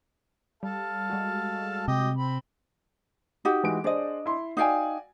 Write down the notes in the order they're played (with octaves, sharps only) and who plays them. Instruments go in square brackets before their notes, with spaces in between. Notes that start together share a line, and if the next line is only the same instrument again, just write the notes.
[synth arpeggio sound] G3 [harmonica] A4 F5 A5
[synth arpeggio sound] G3 G#3 F#4
[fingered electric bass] C3 [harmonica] D#5 G5 D6
[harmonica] C4 B5
[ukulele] D#4 F#4 G4
[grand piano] E3 G#3 D7
[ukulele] D4 D#5 [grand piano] G#4 C5 D5
[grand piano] E4 C6
[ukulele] D#4 F5 G5 [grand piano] F#4 D5 G#5